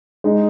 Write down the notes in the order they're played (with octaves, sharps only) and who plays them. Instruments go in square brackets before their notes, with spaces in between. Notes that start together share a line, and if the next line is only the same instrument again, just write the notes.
[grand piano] G#3 D#4